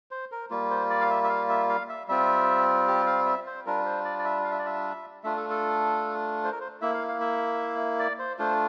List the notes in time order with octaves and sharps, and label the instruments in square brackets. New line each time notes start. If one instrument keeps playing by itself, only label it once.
[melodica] C5
A#4
G3 A#3 F4
C5
D5
F5
E5
E5
F5
E5
F5
E5
G3 C4 F4 E5
G4
F5
E5
C5
G3 D4 F4 A#4
C5
D5
D5
E5
F5
E5
D5
E5
A3 D4 F4 E5
A4
A4
C5
A#4
C5
A#3 E4 E5
F5
F5
E5
D5
C5
A3 D4 F4 C5